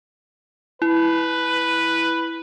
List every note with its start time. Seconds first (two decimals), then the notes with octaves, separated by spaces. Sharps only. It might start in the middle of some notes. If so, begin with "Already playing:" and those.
0.82 E4 B4